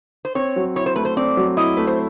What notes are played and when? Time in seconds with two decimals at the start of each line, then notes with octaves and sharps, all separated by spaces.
0.25 C5
0.35 C4 C#5
0.56 F#3
0.76 E4 C#5
0.86 C5
0.96 A3 B4
1.05 C5
1.17 C4 D5
1.37 F#3
1.57 E4 D#5
1.77 A3 B4
1.87 C5